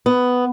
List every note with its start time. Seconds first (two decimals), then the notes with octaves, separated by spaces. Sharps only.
0.06 B3